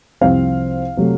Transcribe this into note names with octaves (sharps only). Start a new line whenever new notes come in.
C2 C3 F3 C4 F5
C3 F#3 A3